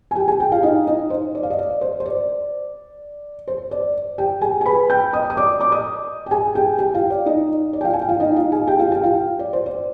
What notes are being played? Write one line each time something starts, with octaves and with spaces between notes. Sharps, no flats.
G#5
G4 G5
G#4 G#5
G4 G5
F4 F5
D#4 D#5
D#4 D#5
C5
D5
F5
D#5
D5
C5
C5
D5
C5
D5
G4 G5
G#4 G#5
G#5
B4 B5
G5 G6
D#5 D#6
D#6
D5 D6
D5 D6
D#5 D#6
G5
G#4 G#5
G4 G5
G4 G5
F4 F5
D5
D#4 D#5
D5
G5
F4 F5
G#5
G5
F4 F5
D#4 D#5
F4 F5
G#4 G#5
G4 G5
F4 F5
G4 G5
F4 F5
D5
C5
D5